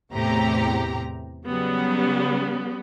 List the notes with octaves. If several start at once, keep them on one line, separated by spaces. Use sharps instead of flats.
E2 A2 C3 G4 A#5
C#3 F#3 G3 B3